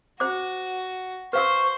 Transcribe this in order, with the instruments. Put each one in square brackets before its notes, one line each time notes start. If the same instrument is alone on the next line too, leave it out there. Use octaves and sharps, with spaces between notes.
[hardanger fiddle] F#4 [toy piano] C5 D6
[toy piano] B4 F5 E6 [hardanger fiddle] C5 [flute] C#6